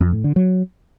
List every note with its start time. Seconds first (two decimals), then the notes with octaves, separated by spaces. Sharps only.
0.01 F2
0.12 A2
0.24 D3
0.36 F#3